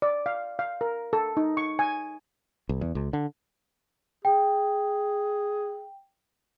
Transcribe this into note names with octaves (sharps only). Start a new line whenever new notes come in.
D5
F5
F5
A#4
A4
D#4
C#6
G#5
C2
E2
C#2
D3
G#4 G5